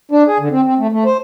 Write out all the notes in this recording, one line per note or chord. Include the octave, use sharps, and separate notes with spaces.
D4
G#4
D3
C4
C4
A3
A3
C5